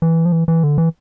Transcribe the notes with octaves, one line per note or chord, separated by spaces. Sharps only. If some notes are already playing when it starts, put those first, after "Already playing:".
E3
F3
E3
E3
D3
E3